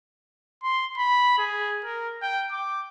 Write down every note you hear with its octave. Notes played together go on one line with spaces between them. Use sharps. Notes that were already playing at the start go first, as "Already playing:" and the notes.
C6
B5
G#4
A#4
G5
D6